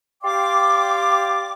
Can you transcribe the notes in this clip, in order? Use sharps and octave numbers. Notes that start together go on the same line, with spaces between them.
G4 D5 F5 G5 C6 D6